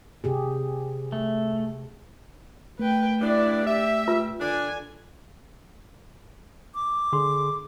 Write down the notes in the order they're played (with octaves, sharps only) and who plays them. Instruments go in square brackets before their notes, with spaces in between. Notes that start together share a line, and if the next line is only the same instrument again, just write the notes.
[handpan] C3 G4 G#4
[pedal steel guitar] A3
[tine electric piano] A3 [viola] B4 G5
[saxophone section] G3 B3 D4 [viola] E4 D5
[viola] G4 [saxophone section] E5
[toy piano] F4 B4
[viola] D3 G#5 [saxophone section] D4
[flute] D6
[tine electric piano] D3 G#4 C6